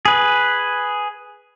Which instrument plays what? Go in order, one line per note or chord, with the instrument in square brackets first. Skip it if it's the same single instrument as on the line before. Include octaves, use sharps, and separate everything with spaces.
[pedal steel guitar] G#4 B4